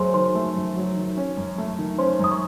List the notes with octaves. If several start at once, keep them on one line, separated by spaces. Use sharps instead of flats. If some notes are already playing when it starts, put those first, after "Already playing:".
Already playing: F#2 F#3 A3 F#4 G#4 C5 G#5 C6
D#3 C5 C6
A3
F#2
F#3
D#3
C#4
F#2
A3
D#3
C#4 C5 C6
F#2 D#6
C#6